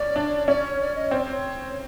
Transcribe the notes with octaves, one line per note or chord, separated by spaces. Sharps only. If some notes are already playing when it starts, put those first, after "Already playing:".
Already playing: C#4 D5
D4
C#4 D5
C#5
D5
D#5
C4 D5
C5
C#5